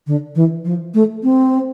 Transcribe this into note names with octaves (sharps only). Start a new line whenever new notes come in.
D3
E3
F3
A3
C4